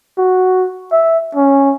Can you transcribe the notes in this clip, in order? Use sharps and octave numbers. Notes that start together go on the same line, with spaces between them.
F#4
E5
C#4